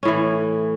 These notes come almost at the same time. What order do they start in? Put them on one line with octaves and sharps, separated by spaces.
C#4 A2 E3